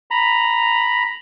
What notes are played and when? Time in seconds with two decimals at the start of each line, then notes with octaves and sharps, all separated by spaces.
0.11 A#5 B5